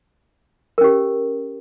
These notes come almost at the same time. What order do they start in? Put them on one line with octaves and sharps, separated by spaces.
A#4 C#4 G4